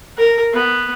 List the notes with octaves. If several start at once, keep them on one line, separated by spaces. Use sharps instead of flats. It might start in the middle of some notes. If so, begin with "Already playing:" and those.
A#4
B3